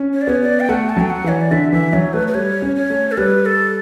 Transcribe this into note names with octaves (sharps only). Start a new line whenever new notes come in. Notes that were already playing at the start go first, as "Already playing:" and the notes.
Already playing: C#4
C#5
D5
B3 C#5
D5
G5
A3 F#5
A5
F#3 G5
F#5
E3 C#5
D5
D3 E5
E3 E5
F#3 C#5
A3 B4
B4
G3 C#5
C#4
C#5
A3
A4
G3 B4
A4